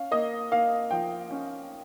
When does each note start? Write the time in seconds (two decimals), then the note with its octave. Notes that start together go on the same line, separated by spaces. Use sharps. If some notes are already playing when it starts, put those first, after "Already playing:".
Already playing: C#4 F5
0.11 A#3 D#5
0.51 A#3 F5
0.91 F3 G5
1.31 C#4